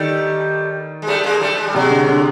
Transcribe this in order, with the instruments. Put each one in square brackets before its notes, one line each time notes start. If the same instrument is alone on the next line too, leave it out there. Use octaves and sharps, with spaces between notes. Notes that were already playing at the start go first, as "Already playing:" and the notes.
Already playing: [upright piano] D#3 [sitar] G3 A3
[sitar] G#3
G3 A3
G#3 A#3
G3 A3
G#3
G3
[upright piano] C3 [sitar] F#3 G#3
[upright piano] D3
D3